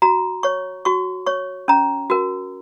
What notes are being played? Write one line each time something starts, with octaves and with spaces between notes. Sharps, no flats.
F#4 A#5
C#5 C#6
F#4 C#6
C#5 C#6
C#4 A#5
F#4 A#4